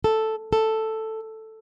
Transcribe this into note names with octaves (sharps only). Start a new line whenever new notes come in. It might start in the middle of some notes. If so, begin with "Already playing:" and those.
A4
A4